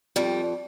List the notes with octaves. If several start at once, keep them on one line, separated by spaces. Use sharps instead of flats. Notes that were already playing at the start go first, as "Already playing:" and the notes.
F2 G3